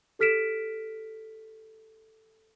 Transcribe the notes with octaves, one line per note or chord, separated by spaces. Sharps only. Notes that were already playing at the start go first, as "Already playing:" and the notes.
G4 A4 F6 B6 D7 E7